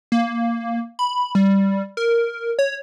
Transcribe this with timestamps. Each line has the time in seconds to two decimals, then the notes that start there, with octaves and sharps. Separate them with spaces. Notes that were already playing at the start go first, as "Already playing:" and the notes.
0.12 A#3
0.99 B5
1.35 G3
1.97 A#4
2.59 C#5